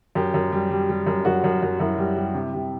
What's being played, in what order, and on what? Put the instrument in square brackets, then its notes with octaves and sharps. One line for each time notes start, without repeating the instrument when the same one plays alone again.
[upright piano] F#2 G4
F#2
G3
G3
G3
F#2
F#2 F#4
F#2
F#2
F#2 E4
G3
G3
C3
C3